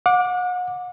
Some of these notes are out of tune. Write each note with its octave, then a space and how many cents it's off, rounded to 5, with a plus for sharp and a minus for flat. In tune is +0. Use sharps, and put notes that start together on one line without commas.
F#5 -40 D6 +0